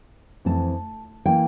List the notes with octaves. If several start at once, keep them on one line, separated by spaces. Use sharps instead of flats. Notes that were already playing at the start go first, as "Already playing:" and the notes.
F2 E3 A3 C4 A5
E3 A#3 G5